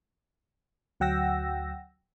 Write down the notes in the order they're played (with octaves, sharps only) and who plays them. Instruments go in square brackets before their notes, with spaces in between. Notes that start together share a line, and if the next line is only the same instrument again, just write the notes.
[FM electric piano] D2 F#3 F#5 G5 E6 A#6